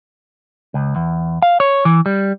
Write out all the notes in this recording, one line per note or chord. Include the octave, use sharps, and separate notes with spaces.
C#2
E2
F5
C#5
E3
G3